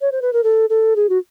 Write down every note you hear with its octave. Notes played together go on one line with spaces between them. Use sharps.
C#5
C5
B4
A#4
A4
A4
G#4
F#4